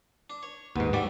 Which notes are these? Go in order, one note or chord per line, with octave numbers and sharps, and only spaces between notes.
D4
C#5
D#2 G#2 B2
C3 F#3 G3 A3 D5